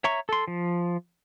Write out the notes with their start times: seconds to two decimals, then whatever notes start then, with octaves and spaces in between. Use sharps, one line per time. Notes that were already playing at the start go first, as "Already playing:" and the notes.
0.04 C#5 E5 A#5 C#6
0.29 A4 C6
0.48 F3